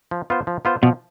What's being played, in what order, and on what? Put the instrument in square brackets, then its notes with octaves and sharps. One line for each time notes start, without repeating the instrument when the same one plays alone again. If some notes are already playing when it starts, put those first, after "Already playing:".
[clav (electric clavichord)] F3
B3 F4 C5
F3
B3 F4 C5
[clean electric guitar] B2 [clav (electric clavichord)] F3